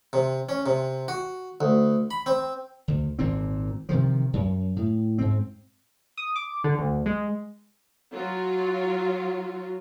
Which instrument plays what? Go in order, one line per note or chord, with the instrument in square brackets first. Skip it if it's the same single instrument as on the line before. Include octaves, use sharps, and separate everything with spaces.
[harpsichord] C3
C#4
C3
F#4
D2
B5
C4
[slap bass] D2
G#1 A#2 C4
C3 D#3 F3
F#2
A2
G#2 C4
[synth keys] D#6
D6
D3
D2
G#3
[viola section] F#3 F4